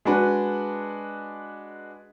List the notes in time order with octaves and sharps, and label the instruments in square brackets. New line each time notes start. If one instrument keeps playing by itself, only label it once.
[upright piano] G#3 D4 F#4 B4